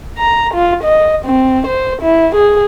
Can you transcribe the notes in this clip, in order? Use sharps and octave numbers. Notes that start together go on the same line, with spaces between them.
A#5
F4
D#5
C4
C5
E4
G#4